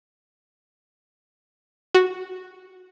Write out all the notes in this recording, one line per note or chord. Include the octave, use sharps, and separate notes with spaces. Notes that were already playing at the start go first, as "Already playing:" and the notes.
F#4